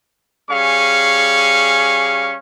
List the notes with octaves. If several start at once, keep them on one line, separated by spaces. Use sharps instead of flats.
G3 C#4 G#4 F5 C#6